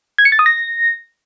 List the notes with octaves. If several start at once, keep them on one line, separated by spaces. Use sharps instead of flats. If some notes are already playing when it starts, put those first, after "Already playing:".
G#6
C#7
A6
D#6
A#6